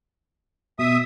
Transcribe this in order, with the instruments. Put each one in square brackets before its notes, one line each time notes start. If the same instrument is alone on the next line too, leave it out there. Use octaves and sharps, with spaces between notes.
[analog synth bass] B2 [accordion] E5 D#6